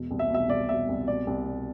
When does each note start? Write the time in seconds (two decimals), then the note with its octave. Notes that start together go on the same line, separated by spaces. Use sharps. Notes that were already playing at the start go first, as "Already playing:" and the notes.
Already playing: E1 B2
0.11 C2
0.19 E5
0.30 B2 E5
0.49 C2 D5
0.69 B2 E5
0.89 C2
1.08 B2 D5
1.27 C2
1.46 B2